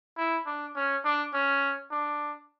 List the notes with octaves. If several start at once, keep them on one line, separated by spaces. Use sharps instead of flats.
E4
D4
C#4
D4
C#4
D4